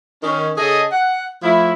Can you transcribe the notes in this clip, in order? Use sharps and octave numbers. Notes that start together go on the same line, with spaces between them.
D#3 C#4
C#3 G#4 A4 D#5
F#5
F3 A3 E4